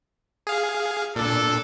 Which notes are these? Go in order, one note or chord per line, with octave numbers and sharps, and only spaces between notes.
G#4 F5
A#2 D4 A4